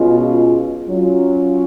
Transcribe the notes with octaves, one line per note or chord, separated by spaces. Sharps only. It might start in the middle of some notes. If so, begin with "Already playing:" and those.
Already playing: B2 G#3 C#4 F4
F#3 C#4 F4